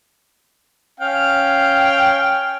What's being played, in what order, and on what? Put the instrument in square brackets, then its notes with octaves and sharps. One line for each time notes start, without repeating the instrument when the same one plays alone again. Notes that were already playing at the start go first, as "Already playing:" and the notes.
[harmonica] C#4 F5 G5